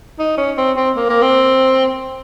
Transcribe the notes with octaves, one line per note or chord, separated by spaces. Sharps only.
D#4
C#4
C4
C4
A#3
A#3
C4